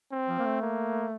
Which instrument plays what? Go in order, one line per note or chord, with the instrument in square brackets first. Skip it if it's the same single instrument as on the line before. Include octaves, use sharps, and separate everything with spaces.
[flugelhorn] C4
[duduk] F3
A#3
A3
[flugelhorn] A#3